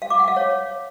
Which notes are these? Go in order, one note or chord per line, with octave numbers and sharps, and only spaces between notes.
F5
D6
F#5
F5
C#5